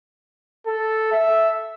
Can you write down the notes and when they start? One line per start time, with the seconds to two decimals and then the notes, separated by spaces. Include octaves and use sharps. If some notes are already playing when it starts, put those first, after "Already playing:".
0.67 A4
1.12 E5